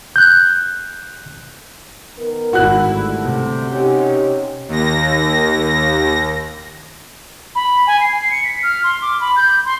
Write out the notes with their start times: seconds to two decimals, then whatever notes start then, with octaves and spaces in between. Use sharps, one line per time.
0.16 F#6 G6
2.17 D#3 B3 A#4
2.53 G#1 E4 F#4 F#6
2.86 D3 G3 A3
3.22 C3
3.71 C#4 D#4 G4
4.69 D#2 A#6
7.55 B5
7.87 G#5
8.01 C7
8.31 C#7
8.44 B6
8.63 F6
8.84 C6
9.02 D6
9.21 B5
9.36 G6
9.65 C6